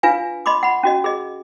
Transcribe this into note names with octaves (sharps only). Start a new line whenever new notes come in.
D4 F4 B4 F5 G#5
D#5 B5 C6 D6
F#5 B5
C#4 F#4 D#5
G#4 D#5